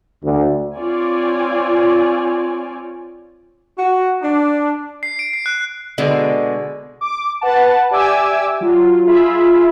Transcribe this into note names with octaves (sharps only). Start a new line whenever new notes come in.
D2
C4 F4 C#5 D5 G#5
F#4
D4
C7
D7
C7
F#6
B2 D3 G#3
D6
B4 F#5 A5
G4 D5 E5 G#5 D6 E6
F#3 F4
F4 G#4 E5 B5